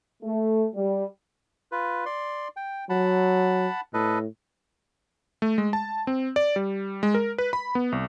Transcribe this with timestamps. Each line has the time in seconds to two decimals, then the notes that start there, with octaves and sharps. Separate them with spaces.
0.22 A3
0.75 G3
1.72 F4 B4
2.06 D5 C6
2.57 G5
2.90 F#3 F#5 A5 B5
3.94 A2 A4 B4 D#5
5.42 A3
5.58 G#3
5.73 A5
6.07 C4
6.36 D5
6.56 G3
7.03 G#3
7.14 A#4
7.38 B4
7.53 B5
7.75 B3
7.92 C2